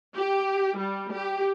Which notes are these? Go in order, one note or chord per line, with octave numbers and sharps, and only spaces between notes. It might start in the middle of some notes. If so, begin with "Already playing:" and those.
G4
G3
G4